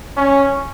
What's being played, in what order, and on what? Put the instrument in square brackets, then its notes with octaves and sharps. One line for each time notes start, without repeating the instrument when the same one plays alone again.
[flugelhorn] C#4